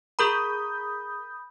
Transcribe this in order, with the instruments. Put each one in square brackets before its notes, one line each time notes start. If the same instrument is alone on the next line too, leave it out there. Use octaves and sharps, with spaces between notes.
[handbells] G#4 A#4 A#5 [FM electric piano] B5 D#6 G6